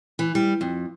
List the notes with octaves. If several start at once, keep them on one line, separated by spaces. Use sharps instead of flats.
E3
G3
F2